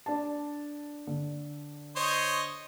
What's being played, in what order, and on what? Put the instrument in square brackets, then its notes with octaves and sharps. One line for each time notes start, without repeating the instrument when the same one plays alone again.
[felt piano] D4 A5
D3
[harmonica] C5 C#5 D#5